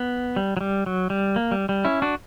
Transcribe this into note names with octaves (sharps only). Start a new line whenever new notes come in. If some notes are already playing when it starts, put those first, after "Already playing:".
Already playing: B3
G3
F#3
G3
F#3
G3
A#3
G3
G3
C#4 E4
D4 F#4